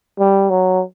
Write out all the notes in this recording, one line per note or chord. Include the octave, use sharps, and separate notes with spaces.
G3
F#3